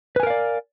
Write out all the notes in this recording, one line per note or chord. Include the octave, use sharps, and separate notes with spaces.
A#4 B4 D5 F5 G#5